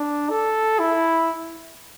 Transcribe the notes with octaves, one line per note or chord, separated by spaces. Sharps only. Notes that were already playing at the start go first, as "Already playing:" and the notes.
Already playing: D4
A4
E4